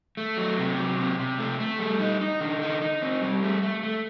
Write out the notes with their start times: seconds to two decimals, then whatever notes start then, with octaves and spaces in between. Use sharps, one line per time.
0.17 A3
0.37 F#3
0.58 C3
0.77 F#3
0.98 C3
1.19 C3
1.39 A3
1.60 A3
1.79 G3
2.00 D#4
2.21 D#4
2.41 D3
2.62 D#4
2.82 D#4
3.02 C4
3.22 G3
3.43 A3
3.63 A3
3.83 A3